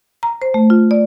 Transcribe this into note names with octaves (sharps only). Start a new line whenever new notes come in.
A#5
C5
A3
F4
D5